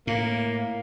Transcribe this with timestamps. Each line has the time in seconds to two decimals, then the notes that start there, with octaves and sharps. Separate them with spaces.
0.07 A2 A#3